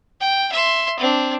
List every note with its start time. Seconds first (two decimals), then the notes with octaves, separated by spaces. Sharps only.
0.21 G5
0.52 E5 C6
0.99 C4 D4